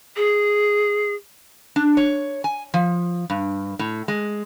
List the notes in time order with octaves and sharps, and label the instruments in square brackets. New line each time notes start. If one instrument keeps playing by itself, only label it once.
[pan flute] G#4
[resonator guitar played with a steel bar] D4
C#5
G#5
F3
G2
A2
G#3